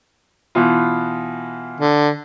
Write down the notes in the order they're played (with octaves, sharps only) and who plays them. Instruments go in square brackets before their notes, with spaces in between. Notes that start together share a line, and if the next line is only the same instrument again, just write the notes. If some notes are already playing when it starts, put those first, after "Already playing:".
[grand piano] B2 E3 F4
[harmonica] D3